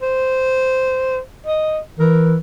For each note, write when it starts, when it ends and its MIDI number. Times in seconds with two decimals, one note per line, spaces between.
0.02 1.20 72
1.46 1.79 75
1.99 2.37 52
1.99 2.35 70